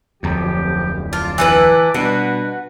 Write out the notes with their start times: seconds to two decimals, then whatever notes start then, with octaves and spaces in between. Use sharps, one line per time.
0.23 D1 F2 F3 G4
1.13 F4 A5 D6
1.38 E3 E4 B4
1.94 B2 G3 D4 F#4 B4